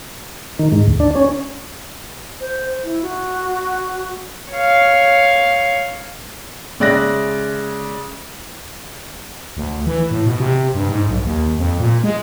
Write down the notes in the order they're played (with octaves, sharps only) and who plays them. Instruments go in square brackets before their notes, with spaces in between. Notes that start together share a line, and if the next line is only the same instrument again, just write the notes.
[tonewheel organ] D#3
G#2
D2
D4
C#4
[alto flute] C5
E4
F#4
[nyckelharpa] C#5 F5
[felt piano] C#3 G#3 D5 E5 F#6 A#6
[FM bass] D2
E3
A2
B2
C3
G2
G#2
B1
D#2
F2
A#2
G#3